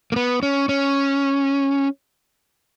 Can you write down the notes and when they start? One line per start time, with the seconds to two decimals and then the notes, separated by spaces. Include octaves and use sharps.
0.12 A#3
0.16 B3
0.43 C#4
0.69 C#4